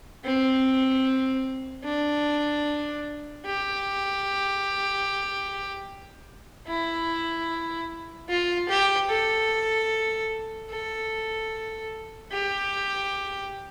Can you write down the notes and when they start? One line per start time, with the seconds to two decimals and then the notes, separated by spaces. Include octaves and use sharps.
0.24 C4
1.84 D4
3.45 G4
6.68 E4
8.29 F4
8.69 G4
9.10 A4
10.70 A4
12.32 G4